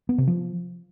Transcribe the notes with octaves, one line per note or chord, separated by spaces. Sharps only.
B3
C3
F3